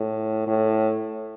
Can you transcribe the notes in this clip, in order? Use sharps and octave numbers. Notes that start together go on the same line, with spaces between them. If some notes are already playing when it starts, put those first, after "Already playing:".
Already playing: A2
A2